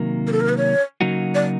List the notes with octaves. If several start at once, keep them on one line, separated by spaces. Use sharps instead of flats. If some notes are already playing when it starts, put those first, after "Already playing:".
Already playing: C3 D#3 F#3 A#3
A#4
A4
A#4
B4
C#5
C#3 F#3 A#3 D#4 F#4
D5